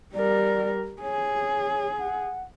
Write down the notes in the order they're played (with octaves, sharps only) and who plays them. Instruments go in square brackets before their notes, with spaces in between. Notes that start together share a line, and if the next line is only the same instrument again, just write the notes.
[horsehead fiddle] G3 A#4 [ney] D5
[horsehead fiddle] G#4 [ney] C#5
[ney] F#5